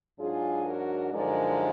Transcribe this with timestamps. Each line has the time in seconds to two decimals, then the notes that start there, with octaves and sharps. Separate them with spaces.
0.19 G#2 F#3 D4 F4 G#4
0.66 F#4 A#4
1.13 F#2 D3 F3 G#3 D#4 A#4 D5